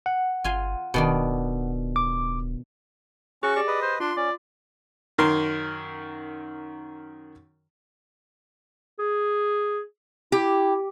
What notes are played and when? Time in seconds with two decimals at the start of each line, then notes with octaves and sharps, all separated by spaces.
0.06 F#5
0.44 G1 F4 G#5 C6
0.94 D1 B2 D#3 D4
1.96 D6
3.43 C#4 F#4 G#4 C#6
3.56 G4 D5 A#6
3.68 B4 D#5
3.82 C5
4.00 D4 F4 C6
4.17 C#4 D5
5.18 F#2 D#3 A#4 C6
8.99 G#4
10.32 E4 G4